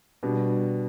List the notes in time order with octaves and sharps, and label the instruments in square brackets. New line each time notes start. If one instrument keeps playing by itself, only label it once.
[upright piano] B2 G3 D4